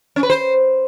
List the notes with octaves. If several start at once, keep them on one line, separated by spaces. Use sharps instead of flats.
C#4
B4
C5